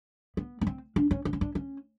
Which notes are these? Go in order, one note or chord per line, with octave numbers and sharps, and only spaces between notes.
B3
B3
C4
D4
C#4
D4
C#4
D4
C#4